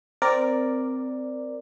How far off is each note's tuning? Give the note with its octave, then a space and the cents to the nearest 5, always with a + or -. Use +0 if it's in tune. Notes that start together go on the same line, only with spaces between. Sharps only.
C4 -15 A#4 +0 D5 +0